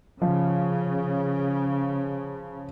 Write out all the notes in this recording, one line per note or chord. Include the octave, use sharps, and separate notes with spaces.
C#3 F3